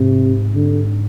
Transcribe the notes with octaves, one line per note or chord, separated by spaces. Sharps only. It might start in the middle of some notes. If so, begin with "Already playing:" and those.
Already playing: G#2 C3
D3